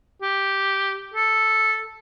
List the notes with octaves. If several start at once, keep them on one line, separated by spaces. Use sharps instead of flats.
G4
A4